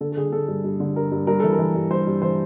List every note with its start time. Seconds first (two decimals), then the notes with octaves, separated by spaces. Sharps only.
0.01 D3 A4
0.12 A4
0.17 D3 G#4
0.32 D3 A4
0.48 G2
0.64 G2
0.80 D3
0.96 G2 A#4
1.12 G2
1.27 G2 A#4
1.40 E3 A4
1.53 A#4
1.59 E3
1.75 G2
1.90 G2 C5
2.07 G2
2.22 E3 C5